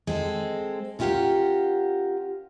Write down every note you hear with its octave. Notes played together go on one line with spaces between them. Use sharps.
G#3 C4 A4
C#4 E4 F4 G4 A#4 F#5